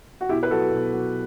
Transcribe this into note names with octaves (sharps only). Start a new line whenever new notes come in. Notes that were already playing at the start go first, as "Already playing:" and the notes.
F#4
B2 E4 G4
B4
F#3 F#4 A4
B2
F#3